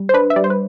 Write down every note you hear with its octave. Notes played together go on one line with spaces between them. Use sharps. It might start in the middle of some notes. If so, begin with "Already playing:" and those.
Already playing: G3
C5
D4 B4
E5
G3 D5
C5
B4